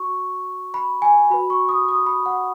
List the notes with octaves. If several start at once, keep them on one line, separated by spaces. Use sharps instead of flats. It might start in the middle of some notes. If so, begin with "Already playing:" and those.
Already playing: F#4 C#6
B5
G#5
F#4 B4 B5
C#6
D#6
D#6
B5
F#5